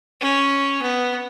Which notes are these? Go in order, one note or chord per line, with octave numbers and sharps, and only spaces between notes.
C#4
B3